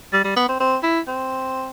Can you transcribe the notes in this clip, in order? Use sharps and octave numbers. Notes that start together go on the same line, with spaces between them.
G3
G3
B3
C4
C4
E4
C4